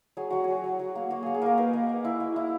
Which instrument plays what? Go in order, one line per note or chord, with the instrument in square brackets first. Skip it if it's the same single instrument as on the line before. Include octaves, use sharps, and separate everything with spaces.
[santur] F#3 G#4
F#3 F#4
F#3 G#4
F#3
F#3
A#3
A#3 F#4
A#3 G#4
G#4
A#3 A#4
D#4 B4
A#3
A#3
E4
A#3
E4